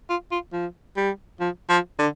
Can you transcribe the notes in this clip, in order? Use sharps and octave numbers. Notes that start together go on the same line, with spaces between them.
F4
F4
F3
G3
F3
F3
D3